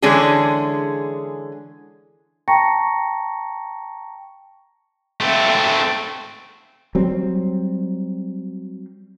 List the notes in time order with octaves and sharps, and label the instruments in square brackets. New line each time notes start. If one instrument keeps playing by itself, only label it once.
[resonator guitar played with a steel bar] D3 E3 G#3 C#4 D4 G#4
[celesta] G5 A5 A#5 C#6 A#6 C#7
[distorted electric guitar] A3 C4
[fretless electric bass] F#3 G3 C4